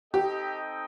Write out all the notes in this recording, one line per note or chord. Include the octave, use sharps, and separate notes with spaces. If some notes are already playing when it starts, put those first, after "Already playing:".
C4 D#4 G4 A4 D#5 G5